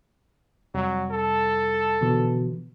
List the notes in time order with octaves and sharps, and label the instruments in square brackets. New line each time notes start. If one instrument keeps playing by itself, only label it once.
[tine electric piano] F2 C3 G3 [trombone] F#3
[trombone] A4
[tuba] B2 [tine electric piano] D3 E3 F3